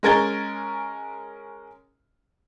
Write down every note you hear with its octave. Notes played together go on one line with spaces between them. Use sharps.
G#3 C#4 A#4 G#6 A6 G7